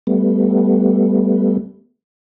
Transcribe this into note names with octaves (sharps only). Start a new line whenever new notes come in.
G3 A3 B3